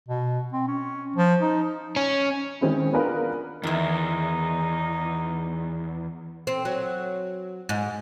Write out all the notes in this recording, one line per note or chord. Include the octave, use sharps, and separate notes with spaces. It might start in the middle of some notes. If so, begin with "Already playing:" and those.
B2
C4
C#4
F3
D#4
C#4
D#3 G#3 C4 C#4 E4
B3 D4 F4 G#4 A#4 B4
E2 D#3 D#4 E4
C4
F#3
G#2